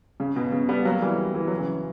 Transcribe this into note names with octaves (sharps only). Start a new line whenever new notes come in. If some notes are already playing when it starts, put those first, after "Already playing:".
C#3
B2
C#3
G3 B3
F#3 A#3
E3 G3
E3
F#3
C#3 E3